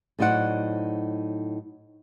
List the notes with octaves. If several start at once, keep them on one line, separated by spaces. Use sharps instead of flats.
A2 F#3 D#4 C5 D5 F#5